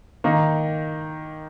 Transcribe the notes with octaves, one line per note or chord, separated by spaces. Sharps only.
D#3 A#3 D#4